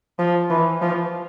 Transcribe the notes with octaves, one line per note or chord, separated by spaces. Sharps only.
F3
E3
F3